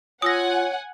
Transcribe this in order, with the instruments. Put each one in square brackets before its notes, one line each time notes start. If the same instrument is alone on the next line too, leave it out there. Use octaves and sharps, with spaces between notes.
[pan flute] F4 [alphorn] C#5 [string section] F#5 G#5 [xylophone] D#6 E6 A#6